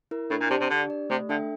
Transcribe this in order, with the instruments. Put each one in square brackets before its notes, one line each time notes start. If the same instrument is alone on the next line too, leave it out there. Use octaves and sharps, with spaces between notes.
[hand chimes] E4 A#4
[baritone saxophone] A2 [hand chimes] D4
[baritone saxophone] A#2
[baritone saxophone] C3 [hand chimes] G4 D5 A5
[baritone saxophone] C3
[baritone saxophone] D3 [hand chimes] D4
[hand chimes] G4 D5
[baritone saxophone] C3 [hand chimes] A3
[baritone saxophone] D3 [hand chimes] D4 A4 E5 G5